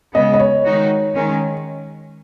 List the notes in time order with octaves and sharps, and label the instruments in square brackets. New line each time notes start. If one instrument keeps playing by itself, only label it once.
[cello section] C#3 G#3 B3 [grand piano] D#5
[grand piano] D#5
C#5
[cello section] D#3 G#3 D#4 F#4
D#3 G#3 C#4